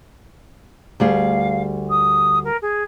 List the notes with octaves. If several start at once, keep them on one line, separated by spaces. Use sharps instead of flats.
D2 G3 G#4 F5
D#6
A#4
G#4